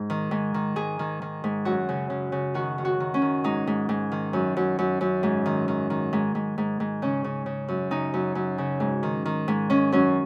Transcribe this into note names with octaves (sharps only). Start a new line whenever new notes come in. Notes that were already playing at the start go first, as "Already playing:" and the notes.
Already playing: G#2
D#3
G#2
D#3
G#2 G#4
D#3
D#3
G#2
F#2 F#4
C#3
C#3
C#3
D#3 F#4
D#3
F#4
D#3
C#4
D#3
G#2 D#4
G#2
G#2
D#3
F#2
F#2
F#2
F#2
G#2
D#3
D#3
D#3
G#2
G#2
G#2
G#2
C#3 C#4
C#3
C#3
F#2
C#3 D#4
F#2
F#2
C#3
G#2
D#3
D#3
G#2
D#3 C#4
F#2 C#4